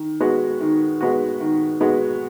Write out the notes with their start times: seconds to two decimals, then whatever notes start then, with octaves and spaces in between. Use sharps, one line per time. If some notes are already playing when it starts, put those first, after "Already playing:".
Already playing: D#3
0.20 G#3 B3 F#4
0.60 D#3
1.01 G#3 B3 F#4
1.40 D#3
1.81 G#3 B3 F#4